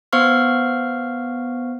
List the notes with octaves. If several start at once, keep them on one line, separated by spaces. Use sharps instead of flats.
B3 C5 F5 C#6 F6